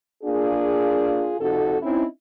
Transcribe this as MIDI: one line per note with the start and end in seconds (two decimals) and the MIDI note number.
0.23 1.34 58
0.23 1.34 62
0.23 1.34 65
0.23 1.34 68
1.40 1.78 41
1.40 1.78 48
1.40 1.78 63
1.40 1.78 66
1.40 1.78 69
1.82 2.04 60
1.82 2.04 61
1.82 2.04 63
1.82 2.04 64